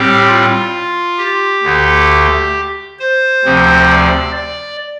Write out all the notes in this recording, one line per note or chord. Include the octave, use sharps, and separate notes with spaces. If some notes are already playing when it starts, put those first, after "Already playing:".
Already playing: A2 G3 C4 G4
F4
G4
D2 D3 A3
C5
D2 C3 F3 C4
D5
D5